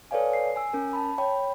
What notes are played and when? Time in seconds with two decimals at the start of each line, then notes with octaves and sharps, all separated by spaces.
0.11 A4 B4 C#5 D5 F5 G#5
0.33 C7
0.56 G#5 E6
0.73 C#4 A#4
0.93 A5 B5
1.18 C#5 G5 B5